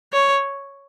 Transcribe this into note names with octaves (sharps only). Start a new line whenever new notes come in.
C#5